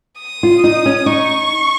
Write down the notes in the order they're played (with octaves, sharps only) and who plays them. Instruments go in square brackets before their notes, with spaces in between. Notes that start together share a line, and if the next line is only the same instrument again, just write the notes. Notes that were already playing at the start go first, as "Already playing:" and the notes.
[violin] D#6
[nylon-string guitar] F4
D#4
C#4
[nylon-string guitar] D#4 [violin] C#6